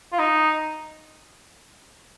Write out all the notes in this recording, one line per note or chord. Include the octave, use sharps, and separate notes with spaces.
F4
D#4